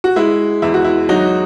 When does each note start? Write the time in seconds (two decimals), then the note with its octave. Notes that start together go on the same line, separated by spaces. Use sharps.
0.04 F#4
0.16 G#3 E4
0.62 E2 E4
0.74 F#4
0.84 E4
1.09 F#3 D#4 F#4